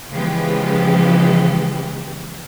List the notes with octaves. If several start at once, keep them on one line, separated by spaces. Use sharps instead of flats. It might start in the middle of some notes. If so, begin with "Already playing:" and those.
C#3 E3 F3 G#3 B3 G4